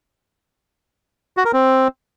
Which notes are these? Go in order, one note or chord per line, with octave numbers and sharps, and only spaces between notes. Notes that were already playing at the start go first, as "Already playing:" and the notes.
F#4
A#4
C4